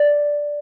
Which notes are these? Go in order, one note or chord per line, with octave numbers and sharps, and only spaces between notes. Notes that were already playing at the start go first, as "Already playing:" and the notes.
Already playing: D5